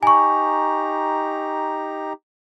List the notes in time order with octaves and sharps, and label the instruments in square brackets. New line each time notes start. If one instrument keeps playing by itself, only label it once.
[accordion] D#4 G4 A#5 [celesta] G#5 C#6